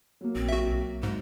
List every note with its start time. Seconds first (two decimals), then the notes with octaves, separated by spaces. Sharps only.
0.21 F#3 A#3
0.36 A#1 C4
0.49 F#4 E5
0.67 B1
1.03 G#2 G#3